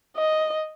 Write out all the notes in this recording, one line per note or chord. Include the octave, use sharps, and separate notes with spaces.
D#5